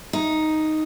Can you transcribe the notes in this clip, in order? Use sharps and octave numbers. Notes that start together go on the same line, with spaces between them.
D#4